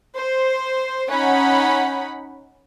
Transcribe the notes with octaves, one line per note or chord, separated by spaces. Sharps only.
C5
C#4 D#4 F#5 B5